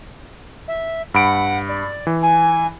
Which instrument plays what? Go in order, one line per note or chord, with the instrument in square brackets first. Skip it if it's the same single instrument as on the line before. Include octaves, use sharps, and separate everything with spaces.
[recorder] E5
[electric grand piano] G2 B5 D7 [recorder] F#5
[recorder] D5
[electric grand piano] E3
[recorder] G#5